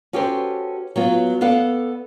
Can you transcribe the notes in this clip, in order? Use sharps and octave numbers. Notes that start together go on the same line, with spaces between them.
C#4 F#4 G4 A4 B4 C5
F#3 B3 F4
B3 A4 D5 F5 F#5